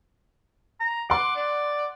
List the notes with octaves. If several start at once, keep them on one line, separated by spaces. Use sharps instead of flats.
A#5
F#5 C6 D6
D5